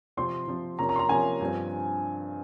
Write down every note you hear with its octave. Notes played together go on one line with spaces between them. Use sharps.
C3 F3 C4 C6
C3 F3 C4
C3 F3 A#3 C#4 A#5
A#5
C6
A#5
C3 F3 A#3 C#4 G#5
G2 F3 C4